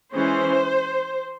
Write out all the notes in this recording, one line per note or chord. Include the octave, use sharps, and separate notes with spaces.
E3 G#3 C#4 C5